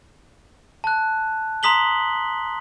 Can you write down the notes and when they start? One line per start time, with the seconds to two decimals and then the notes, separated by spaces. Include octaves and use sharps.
0.84 A5 F#6
1.63 A#5 C6 D#6 B6 F#7 G7